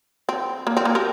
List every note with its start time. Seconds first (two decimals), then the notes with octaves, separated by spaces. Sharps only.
0.29 C4
0.67 A#3
0.77 C4
0.85 A#3 C#4
0.95 G4 A#4